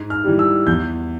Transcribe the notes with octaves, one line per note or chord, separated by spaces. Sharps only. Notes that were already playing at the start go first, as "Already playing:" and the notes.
Already playing: G#2
F6
E3 G3
E6
E2 G6